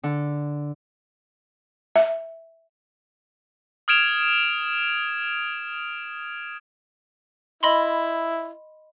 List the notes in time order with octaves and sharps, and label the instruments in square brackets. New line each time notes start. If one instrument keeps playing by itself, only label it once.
[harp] D3
[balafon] E5
[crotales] D#6 F6 G#6 D7 E7 F7
[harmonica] E4 [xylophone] D#5 B5 C6